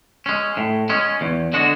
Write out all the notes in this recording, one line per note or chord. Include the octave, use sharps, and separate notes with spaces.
G#3 C#4
A2
G#3 C#4
E2
D3 G#3 D4 F#4